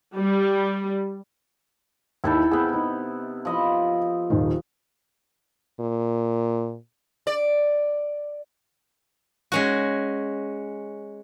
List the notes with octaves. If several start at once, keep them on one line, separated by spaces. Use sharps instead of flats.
G3
D#2 D#3 E4 A4 G5
C3 B3 G#4
D#4
F3 D#5 B5
D#1 D#3
A#2
D5
G#3 C#4 F#4